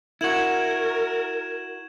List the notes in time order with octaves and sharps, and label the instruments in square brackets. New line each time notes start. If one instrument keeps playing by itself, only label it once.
[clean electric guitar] E4 F#4 [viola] A#4 [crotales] G#6 E7 F#7